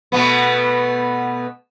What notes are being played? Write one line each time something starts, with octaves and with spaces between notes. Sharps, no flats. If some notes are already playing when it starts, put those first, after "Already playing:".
B2 A3 B3